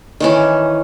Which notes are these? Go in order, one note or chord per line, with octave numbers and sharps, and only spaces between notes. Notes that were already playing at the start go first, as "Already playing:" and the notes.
D#3 E3 C#4